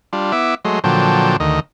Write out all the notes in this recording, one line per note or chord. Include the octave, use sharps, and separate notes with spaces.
G3 D4 F4
B3 E4 E5 D6
F#3 G#3 A3 D#5 C6
A#2 D3 F3 F#3 G5 A5
D2 D#3 D#5